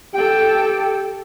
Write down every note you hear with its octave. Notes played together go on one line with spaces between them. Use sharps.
G4 A4 G5